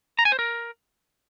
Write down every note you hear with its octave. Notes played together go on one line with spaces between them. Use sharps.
A#5
G#5
C5
A#4